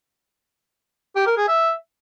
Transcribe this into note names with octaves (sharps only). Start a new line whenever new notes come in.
G4
A#4
G#4
E5